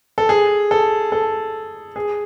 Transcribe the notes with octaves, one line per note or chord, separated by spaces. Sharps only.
A4
G#4
A4
A4
G#4